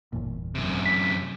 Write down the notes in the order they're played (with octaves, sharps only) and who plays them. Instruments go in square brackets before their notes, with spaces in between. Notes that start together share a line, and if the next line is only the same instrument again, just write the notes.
[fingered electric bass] G1 E2 A#2
[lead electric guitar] F#2 C3
[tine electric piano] B6